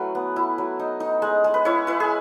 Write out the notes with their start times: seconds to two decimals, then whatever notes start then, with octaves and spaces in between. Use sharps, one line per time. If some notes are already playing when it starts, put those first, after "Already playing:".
Already playing: F#3 A3 C#4 E4 F#4 B4
0.15 B3
0.36 E4
0.58 F#3
0.79 D#4
1.00 D#4
1.22 G#3
1.44 G#3
1.54 B4
1.65 E4 C#5
1.87 E4 B4
2.00 G#4